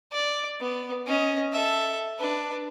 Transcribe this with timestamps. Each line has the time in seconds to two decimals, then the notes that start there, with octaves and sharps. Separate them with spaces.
0.12 D5
0.60 B3
1.07 C#4 D#5
1.53 A4 E5
2.19 D4 B4